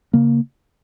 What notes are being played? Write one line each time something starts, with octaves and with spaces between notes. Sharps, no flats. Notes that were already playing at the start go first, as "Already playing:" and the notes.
C#3 A#3